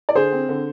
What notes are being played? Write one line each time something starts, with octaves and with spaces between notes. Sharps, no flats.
D5
D3 G#4 C5
C4
D3